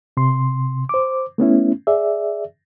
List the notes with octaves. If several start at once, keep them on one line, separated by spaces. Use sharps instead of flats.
C3 C6
C5 D6
A3 B3 C#4 E4
G#4 D5 E5